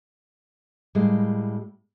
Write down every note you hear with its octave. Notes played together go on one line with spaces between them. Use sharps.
A2 G3 G#3 A#3